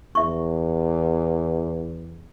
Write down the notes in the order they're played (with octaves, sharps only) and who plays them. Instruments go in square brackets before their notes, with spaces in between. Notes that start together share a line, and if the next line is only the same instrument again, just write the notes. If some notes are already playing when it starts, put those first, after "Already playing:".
[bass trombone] E2 [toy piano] E5 C#6